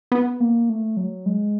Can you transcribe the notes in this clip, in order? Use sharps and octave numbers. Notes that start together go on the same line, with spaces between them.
B3
A#3
A3
F#3
G#3